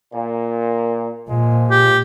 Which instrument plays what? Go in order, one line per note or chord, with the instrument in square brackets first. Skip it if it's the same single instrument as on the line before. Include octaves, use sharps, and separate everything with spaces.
[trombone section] A#2
[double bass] A#2 [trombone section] F3 G#3
[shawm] G4